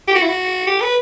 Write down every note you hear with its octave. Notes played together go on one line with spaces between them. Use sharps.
G4
F#4
E4
F#4
G4
B4